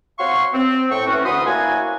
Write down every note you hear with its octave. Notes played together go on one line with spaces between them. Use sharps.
C4 F#4 C#5 F5 C6 C#6
C4
A2 G5 C#6
E3 C#4 F#4
D2 F#4 B5 C6 D#6
A#3 E4 F#4 C#5 F#5 G#5